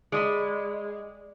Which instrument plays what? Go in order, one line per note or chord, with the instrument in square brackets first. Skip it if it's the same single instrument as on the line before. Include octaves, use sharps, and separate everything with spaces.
[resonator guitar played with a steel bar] G#3 [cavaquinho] D5 D#5 B5